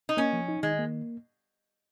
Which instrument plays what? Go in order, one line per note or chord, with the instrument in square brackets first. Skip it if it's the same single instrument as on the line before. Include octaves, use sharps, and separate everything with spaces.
[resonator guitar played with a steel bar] D#4
[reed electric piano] A#3 [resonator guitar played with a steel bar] C#4
[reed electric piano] F3
D#4
[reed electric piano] D#3 [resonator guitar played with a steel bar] G#3
[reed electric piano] A#3